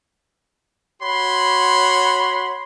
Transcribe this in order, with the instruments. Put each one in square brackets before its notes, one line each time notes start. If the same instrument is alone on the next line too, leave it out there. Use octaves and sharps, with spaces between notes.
[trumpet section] F#4 C#5 B5 C6